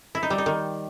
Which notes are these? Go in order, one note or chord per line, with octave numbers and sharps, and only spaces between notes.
E4
D#4
G3
D#4
D#3